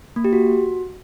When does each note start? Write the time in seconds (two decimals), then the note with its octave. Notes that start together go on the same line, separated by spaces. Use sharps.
0.16 A#3
0.24 G4
0.33 F#4